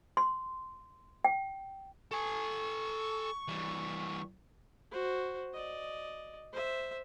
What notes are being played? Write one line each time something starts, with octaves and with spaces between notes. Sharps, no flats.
C6
G5
A4 G#5 C#6
E3 G3
F#4 C5
D5 D#5
C5 E5